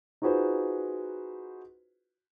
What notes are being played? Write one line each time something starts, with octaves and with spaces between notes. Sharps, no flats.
D#4 F4 F#4 G#4 B4 C5